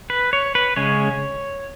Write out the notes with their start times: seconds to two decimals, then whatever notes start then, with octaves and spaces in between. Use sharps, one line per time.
0.10 B4
0.33 C#5
0.55 B4
0.76 C#3 G#3 C#4 C#5